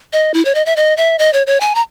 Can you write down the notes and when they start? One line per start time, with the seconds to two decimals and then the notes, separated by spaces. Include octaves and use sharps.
0.13 D#5
0.34 E4
0.45 C#5
0.55 D#5
0.66 E5
0.76 D#5
0.97 E5
1.19 D#5
1.33 C#5
1.47 C#5
1.61 G#5
1.75 A#5